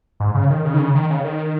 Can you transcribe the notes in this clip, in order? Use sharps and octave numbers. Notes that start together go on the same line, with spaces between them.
G#2
C#3
D#3
C#3
D#3
C#3
D#3
C#3
D#3